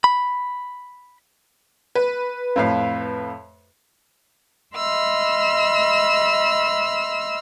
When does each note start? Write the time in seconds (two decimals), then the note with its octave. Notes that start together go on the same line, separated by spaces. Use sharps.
0.04 B5
1.95 B4
2.56 F2 A2 F5
4.75 D#5 E5 B5 C6 E6 F6